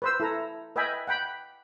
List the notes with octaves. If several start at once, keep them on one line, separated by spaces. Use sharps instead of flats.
B4 C5 E6
E4 A4 A#5
B4 D#5 E5 G5 G#5 B5
F#5 G5 B5